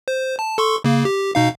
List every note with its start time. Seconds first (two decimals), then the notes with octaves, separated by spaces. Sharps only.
0.08 C5
0.39 A5
0.58 A4 C6 C#6
0.84 C#3 A#3
1.05 G4
1.35 B2 D#4 F5